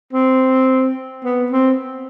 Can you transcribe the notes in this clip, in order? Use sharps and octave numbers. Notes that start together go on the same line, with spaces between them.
C4
B3
C4